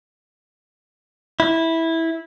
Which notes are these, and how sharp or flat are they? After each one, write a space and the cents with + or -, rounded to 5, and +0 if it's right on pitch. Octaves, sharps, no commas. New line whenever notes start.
E4 -10